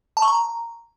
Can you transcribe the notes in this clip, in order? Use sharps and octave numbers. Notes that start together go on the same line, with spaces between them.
A5
C#6
A#5